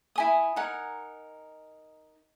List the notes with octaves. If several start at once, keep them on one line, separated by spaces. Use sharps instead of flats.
E4 G#5 D#6
D#4 A#4 F#5 G#5